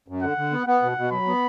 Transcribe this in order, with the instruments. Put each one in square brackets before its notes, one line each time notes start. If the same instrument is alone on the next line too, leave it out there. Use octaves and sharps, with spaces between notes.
[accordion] F#2
[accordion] D3 [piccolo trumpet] F#5
[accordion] D3
B3
[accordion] B3 [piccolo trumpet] F#5
[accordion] B2
B2
[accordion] F#3 [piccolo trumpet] B5
[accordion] B3